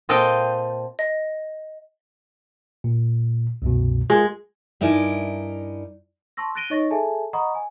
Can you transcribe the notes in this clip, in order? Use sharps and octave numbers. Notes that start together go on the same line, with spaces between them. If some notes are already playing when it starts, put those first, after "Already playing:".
A#2 C4 A4 D#5 F5 G5
D#5
A#2
C2 F#2 B2
G#3 F4 A#4
G2 D#4 E4 A#4 D5 G#5
A5 C6 C#6 E6 A#6
F#6 A6 A#6 D7 D#7 G7
D#4 C#5 D#5 C#6 A6 A#6
G#4 A4 E5 G#5 A5
D#5 F#5 A#5 B5 C#6 D#6
G#5